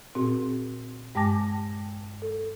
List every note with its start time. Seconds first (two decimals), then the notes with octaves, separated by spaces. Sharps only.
0.15 A#2 C4 F#4 G#4
1.15 G2 G#3 G5 A5 D6 A#6
2.22 A4